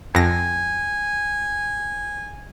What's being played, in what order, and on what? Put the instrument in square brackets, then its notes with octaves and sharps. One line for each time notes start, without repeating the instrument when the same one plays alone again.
[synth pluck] F2 A#6 [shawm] G#5